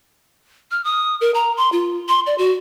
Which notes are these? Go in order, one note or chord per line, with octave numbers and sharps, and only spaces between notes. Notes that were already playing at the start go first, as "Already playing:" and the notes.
F6
D#6
A#4
A#5
C6
F4
C6
D5
F#4